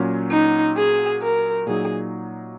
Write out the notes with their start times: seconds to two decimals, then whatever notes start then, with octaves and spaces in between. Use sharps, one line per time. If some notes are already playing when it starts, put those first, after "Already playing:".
Already playing: A#2 F#3 C#4
0.31 D#4
0.77 G#4
1.22 A#4
1.67 A#2 F#3 D#4 G#4